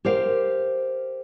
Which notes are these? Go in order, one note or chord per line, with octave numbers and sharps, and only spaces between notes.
G4 A#4 C5 F5